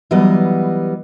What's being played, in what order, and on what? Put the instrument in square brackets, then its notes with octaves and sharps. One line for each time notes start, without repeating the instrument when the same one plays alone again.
[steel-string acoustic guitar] E3 F#3 G3 B3 D#5